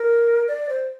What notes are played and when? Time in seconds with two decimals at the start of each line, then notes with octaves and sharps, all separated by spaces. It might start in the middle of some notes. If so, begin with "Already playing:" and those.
Already playing: A#4
0.48 D5
0.69 C5